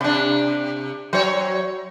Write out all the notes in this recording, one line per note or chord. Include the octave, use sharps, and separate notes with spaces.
C3 D4
F#3 C#5